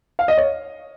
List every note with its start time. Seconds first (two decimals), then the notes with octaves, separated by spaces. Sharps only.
0.19 F5
0.28 D#5
0.38 C#5